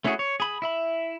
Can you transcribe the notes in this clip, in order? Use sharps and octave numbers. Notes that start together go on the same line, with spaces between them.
A3 C#4 E4 F#4 G#4
C#5
G#4 B5
E4 E5 B5